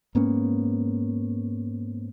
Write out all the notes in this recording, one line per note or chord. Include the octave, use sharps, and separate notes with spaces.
G#2 A#3 B3 C#4